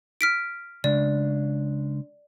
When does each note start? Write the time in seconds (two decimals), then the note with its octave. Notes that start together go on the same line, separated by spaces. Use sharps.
0.21 F6 B6 D7
0.84 C#3 G#3 D4 D5